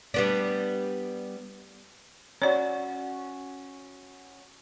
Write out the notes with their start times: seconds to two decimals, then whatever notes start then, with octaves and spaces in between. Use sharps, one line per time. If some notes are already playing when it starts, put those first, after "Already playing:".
0.14 G3 B3 D4
2.42 C#4 F#4 C#5 D5